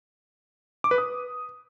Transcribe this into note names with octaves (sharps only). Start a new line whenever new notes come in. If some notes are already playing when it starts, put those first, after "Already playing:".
D6
B4
D#6